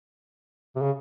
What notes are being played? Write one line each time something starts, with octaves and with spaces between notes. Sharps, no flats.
C3
C#3